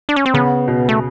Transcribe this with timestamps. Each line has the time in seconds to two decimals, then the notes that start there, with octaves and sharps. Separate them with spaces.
0.09 D4
0.16 C#4
0.26 C4
0.34 C#3 B3
0.68 B2
0.89 A3